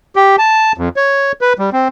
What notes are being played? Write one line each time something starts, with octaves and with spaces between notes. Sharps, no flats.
G4
A5
F2
C#5
B4
G3
C4